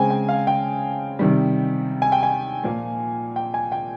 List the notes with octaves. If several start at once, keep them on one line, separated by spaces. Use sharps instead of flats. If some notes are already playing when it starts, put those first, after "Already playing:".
Already playing: C#3 G#3 C4 G5 G#5
G5
F5
G5
C3 D#3 G3
G#5
G5
G#5
A#2 F3 A#3
G5
G#5
G5